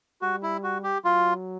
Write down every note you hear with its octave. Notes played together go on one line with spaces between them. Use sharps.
G3 F#4
E4
F#4
G4
F#3 F4